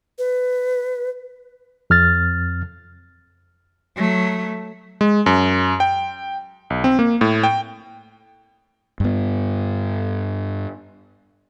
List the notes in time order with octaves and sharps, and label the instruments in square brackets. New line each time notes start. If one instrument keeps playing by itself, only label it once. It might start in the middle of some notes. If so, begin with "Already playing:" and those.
[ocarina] B4
[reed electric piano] F2 F6 A6
[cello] F#3 A3
[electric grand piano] G#3
F#2
G5
B1
C4
A#3
A2
G5
[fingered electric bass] G2 B3